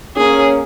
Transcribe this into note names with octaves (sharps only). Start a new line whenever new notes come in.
A#3 C#4 G#4